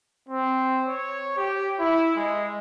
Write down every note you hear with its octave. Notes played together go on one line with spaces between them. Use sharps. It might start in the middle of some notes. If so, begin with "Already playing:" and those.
C4
C#5
G4
E4
G#3